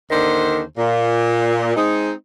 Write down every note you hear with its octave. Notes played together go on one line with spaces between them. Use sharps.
D#2 D3 D#3 D4 C5
A#2
G#3 C4 D#4